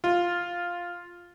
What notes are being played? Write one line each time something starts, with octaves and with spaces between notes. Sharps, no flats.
F4